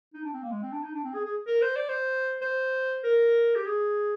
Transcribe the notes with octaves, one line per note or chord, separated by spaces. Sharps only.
D#4
D4
C4
A#3
G#3
C4
D4
D#4
D4
C4
G#4
G#4
A#4
C5
D5
C5
C5
A#4
G4
G#4